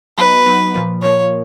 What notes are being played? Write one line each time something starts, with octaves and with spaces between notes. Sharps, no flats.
F#3 B3 D#4 B4
F#3 B3 D#4
A#2 F3 A#3
A#2 F3 A#3 C#5